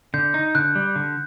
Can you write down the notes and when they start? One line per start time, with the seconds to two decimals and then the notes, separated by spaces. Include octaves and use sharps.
0.14 D3 G6
0.34 D#4
0.55 D3 F#6
0.75 G3
0.96 D3